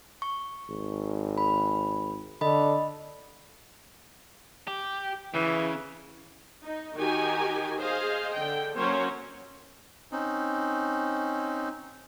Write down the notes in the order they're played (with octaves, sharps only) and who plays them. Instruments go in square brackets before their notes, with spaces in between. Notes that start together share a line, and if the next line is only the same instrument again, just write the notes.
[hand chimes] C#6
[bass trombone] G#1
[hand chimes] B5
[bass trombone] D3 [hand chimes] D#5 B5
[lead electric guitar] G4
[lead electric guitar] C#3 [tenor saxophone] E3
[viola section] D#4
D#3 D#4 F#4 G4 G#5
G#4 C5 D#5 F5
D3 G5
F#3 A#3 C#4 C5 C#5
[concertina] C4 C#4 D#4